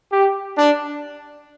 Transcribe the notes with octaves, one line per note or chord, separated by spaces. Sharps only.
G4
D4